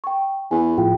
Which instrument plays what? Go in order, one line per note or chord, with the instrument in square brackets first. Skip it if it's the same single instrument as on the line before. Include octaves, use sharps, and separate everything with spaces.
[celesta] G5 C#6
[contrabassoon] E2 [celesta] G#5
[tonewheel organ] A2 F3 F4 [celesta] G5